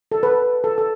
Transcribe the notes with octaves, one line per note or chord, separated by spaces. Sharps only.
A4
B4
A4
A4